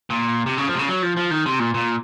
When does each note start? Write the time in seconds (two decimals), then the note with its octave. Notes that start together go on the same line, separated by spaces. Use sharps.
0.10 A#2
0.46 C3
0.58 C#3
0.68 F3
0.74 C3
0.79 C#3
0.89 F#3
1.03 F3
1.17 F3
1.31 D#3
1.46 C3
1.60 A#2
1.74 A#2